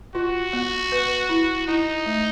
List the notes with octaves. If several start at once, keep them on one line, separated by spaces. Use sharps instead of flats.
F4 F#4
B3
B4
E4
D#4 E4
A3